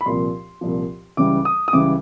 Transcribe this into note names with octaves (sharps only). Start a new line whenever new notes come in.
B5
C2 A#2 F3 C6
C2 A#2 F3
C#2 C#3 E3 G3 D6
D#6
D#6
C#2 C#3 E3 G3 D6